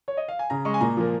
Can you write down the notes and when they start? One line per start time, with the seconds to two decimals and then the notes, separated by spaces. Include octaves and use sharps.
0.08 C#5
0.17 D#5
0.28 F5
0.39 G#5
0.50 C#3 A#5
0.65 G#3 C#6
0.74 G#5
0.81 A#2 A#5
0.97 F3 A#3